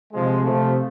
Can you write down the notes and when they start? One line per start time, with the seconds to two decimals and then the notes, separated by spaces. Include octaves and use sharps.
0.12 C3 F3 G#3
0.43 C3 F3 A3